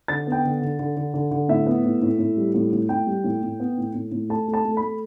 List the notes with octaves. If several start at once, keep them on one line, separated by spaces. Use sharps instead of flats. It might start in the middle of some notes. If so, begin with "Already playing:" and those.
D3 A6
B3 G5
D3
D3
D3
D3
D3
D3
A2 E5
B3
A2
A2
A2
G3
A2
A2
A2 G5
G3
A2
A2
B3
A2
A2
A2
A3 A5
A3
A5
A3
B5
A3